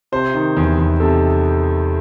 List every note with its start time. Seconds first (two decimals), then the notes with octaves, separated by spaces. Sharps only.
0.12 C3 C5
0.34 D#3
0.57 E2
0.78 E2
1.00 C3 A4